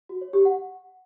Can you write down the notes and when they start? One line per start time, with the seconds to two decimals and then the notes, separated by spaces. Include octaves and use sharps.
0.09 F#4
0.21 C#5
0.33 G4
0.45 F#5